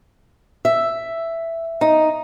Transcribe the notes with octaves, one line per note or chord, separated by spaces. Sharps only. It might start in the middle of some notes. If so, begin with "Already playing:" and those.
E5
D#4